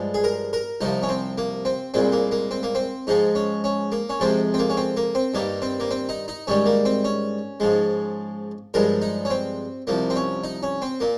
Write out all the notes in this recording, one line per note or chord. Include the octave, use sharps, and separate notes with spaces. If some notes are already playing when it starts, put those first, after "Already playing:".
Already playing: G2 F3 G#3
G#4
A#4
A#4
C2 C3 F3 D#4
C#4
C4
A#3
C4
C2 A#2 G#3 C4
A#3
A#3
C4
A#3
C4
G#2 F3 G#3 D#4
C#4
C#4
A#3
C#4
F2 C3 F3 G#3 C4
C4
A#3
C#4
C4
A#3
C4
G2 D#3 G3 A#3
C4
A#3
C4
D#4
D#4
G#2 D#3 G3 C#4
A#3
C4
C#4
G#2 F3 G#3
G2 F3 G#3 A#4
D#4
C#4
C4
C2 C3 F3 A#3
C4
C#4
D#4
C#4
C4
A#2 A#3